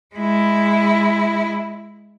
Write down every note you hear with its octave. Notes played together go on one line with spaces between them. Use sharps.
G#3 E4